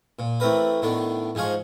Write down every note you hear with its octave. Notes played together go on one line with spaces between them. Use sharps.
A#2
E3 A3 C4 A#4 B4
A2 D#3 B3 D4
G#2 F3 G#4 F5 C#6